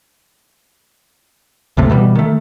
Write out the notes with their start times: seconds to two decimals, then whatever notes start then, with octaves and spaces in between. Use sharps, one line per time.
1.77 C#2 G2 C3 A3
1.90 B2 E3 F#3 G3
2.15 D#3 A3